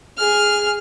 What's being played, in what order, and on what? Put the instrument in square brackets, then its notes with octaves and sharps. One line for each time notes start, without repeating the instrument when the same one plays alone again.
[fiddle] G#4 F6